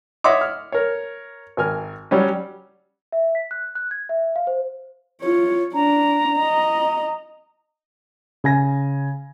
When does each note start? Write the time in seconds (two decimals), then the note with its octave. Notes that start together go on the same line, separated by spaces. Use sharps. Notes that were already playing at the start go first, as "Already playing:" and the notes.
0.24 C#5 D#5 E5 F#5 C6 D6
0.41 F6
0.72 A#4 C#5
1.57 G#1 A#4 G#5 F6
2.11 F#3 G3 C#4
3.12 E5
3.35 B6
3.51 F#6
3.75 F#6
3.91 G#6
4.09 E5
4.36 F5
4.47 C5
5.21 F4 C#5
5.74 D4 A#5
6.39 D#5
8.44 C#3 G#5 A#6